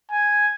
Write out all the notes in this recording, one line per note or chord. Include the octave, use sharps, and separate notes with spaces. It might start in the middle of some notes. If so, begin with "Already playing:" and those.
G#5